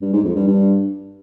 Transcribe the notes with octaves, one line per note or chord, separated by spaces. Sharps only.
G2
G#2
F2
G2
G2